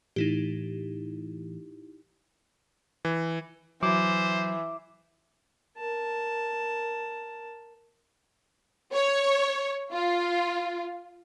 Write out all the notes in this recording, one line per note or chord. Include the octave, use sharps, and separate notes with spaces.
A2 E3 D#4 E4 G4
E3
E3 F#3 C5 D6
A#4 A5
C#5
F4